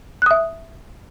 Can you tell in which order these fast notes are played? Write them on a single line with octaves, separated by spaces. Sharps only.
F#6 D#6 E5